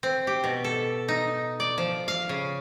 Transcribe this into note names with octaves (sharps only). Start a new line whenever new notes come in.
C4
G4
B2
A4
D#4
D5
F3
F5
C#3